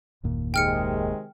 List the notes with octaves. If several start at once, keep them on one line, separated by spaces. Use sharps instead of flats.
F#1 D#2 A#2
C3 D#3 G#3 G5 F6 C#7